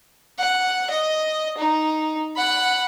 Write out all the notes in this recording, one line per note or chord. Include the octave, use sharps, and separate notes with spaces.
F#5
D#5
D#4
F#5 B5